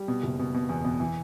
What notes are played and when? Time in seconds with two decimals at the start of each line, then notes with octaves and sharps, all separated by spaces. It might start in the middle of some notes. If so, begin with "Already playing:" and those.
Already playing: G3
0.08 B2
0.23 F#1
0.39 B2
0.54 B2
0.69 E2
0.84 B2
1.00 E3